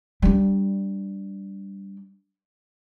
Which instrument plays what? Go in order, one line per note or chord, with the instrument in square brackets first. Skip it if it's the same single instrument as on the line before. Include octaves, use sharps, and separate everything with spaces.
[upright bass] G3 D4